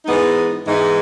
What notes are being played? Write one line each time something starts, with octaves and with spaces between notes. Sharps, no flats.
G#2 E3 G#3 B3 D#4
G#2 E3 G#3 B3 D#4